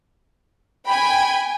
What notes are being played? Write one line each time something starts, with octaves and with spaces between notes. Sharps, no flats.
G5 G#5 B5